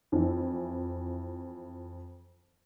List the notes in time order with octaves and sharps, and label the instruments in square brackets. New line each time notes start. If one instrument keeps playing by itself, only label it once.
[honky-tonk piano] F2 E3